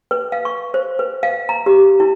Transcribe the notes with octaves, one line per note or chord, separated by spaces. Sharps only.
B4
F5
C#6
C5
B4
F5
A#5
G4
E4